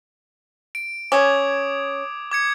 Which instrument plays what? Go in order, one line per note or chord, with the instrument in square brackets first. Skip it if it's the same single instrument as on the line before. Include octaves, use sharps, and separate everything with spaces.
[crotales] D7
[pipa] C#4 [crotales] D6 D#6 G#6
[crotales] D6 G#6 C#7